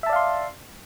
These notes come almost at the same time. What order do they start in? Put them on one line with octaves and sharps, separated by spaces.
E5 A5 D5 F5 C6